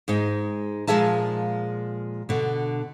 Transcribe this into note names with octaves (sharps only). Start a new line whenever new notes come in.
G#2 G#3 D#4
A#2 F3 G#3 G#4 E5 A5
B2 D3